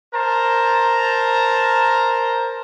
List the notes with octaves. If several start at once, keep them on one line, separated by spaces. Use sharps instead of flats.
A#4 C5 A5 A#5